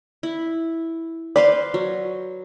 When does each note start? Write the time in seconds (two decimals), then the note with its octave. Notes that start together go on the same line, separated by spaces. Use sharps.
0.23 E4
1.36 B4 C5 D5 F5
1.74 F#3